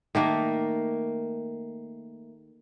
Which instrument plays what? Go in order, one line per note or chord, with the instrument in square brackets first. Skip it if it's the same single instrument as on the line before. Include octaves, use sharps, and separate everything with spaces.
[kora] D#3 A3 A#3